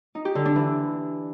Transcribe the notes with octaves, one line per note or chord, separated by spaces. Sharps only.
D#4
G4
D3
D4
E3